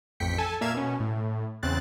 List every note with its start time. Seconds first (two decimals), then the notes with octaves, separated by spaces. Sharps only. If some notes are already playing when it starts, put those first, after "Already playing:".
0.20 A1 F2 G5 B6 C#7
0.38 A4 G#5 A5
0.61 A#2 A#3 E5 F5 G#6 E7
0.74 B2 C#4
1.00 A2
1.63 E2 C#3 C4 F#6 A6